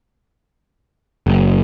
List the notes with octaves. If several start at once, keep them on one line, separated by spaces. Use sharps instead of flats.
F#1